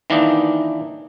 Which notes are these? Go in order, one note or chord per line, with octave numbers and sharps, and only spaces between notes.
D#3 E3 A#3 D4 D#4